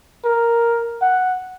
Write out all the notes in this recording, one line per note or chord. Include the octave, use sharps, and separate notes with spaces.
A#4
F#5